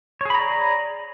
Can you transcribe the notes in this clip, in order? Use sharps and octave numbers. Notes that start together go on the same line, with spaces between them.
G#4 C#5 D5 A#5 B5